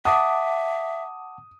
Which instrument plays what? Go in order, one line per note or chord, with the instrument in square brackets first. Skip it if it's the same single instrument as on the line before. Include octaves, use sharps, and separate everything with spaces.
[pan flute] E5 [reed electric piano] F#5 A5 D6 [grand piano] D#6